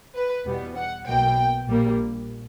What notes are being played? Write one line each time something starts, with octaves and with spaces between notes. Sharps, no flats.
B4
E2 B2 G3 B3
F#5
B1 B2 A#3 G5
A#1 A#2 G3 A#3